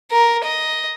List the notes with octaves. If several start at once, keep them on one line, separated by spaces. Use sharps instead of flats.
A#4
D#5